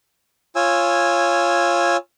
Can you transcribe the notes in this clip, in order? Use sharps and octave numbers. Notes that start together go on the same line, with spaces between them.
F4 C#5 G#5 E6